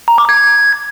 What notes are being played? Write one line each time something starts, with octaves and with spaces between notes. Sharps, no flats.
A#5
D6
G#6